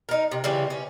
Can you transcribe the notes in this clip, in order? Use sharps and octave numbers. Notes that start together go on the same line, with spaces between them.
D#4 A#4
C3
C#3 E3 G3 C4
C#4